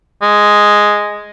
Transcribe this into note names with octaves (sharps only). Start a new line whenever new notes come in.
G#3